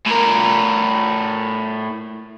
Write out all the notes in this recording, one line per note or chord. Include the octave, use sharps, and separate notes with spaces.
A2 A#4